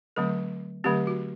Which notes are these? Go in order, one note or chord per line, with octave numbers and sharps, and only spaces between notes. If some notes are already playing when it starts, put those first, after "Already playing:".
D3 F#3 A3 C4 A4
D3 F#3 A3 C4 G4
F#4